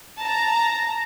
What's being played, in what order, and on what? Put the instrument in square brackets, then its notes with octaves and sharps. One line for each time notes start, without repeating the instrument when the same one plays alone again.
[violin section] A5 A#5